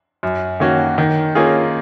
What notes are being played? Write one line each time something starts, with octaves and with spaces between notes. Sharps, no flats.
F#2
D#3 A#3 C#4 F#4
D#3
A#3 C#4 F4 G#4